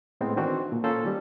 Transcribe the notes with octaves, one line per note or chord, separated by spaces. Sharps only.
A2 G#3 B3 C4
D#3 E3 C4 D4 F#4
A#2
A#3 C#4 F4 A4 C5
D#3 G3